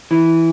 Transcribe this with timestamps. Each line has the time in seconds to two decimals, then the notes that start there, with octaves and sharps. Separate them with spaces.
0.11 E3